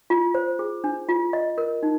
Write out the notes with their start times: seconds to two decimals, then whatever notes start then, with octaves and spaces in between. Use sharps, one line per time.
0.10 F4
0.35 C5
0.59 G#4
0.84 D4
1.09 F4
1.33 D#5
1.58 A#4
1.83 D#4